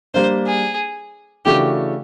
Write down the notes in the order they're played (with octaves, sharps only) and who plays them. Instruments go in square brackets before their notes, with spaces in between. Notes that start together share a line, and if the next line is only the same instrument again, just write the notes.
[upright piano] G3 A#3 D4 [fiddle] C5
[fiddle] G#4
[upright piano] C#3 E3 A3 D4 F#4 [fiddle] G4